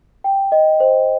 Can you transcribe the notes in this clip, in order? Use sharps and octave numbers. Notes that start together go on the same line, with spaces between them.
G5
D#5
C5